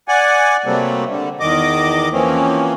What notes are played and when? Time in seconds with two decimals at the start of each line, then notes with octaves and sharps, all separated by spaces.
0.08 D5 F#5 G#5
0.65 C3 F#3 G3 A3 A#3 C4
1.08 D3 G3
1.40 E2 D#3 D#5 D6
2.12 E3 F3 A#3 C4 C#4